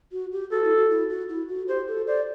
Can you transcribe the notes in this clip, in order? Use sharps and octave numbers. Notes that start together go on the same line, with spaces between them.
F#4
G4
F#4 A4
E4
F#4
E4
F#4
E4
F#4
G4 C5
A4
C5 D5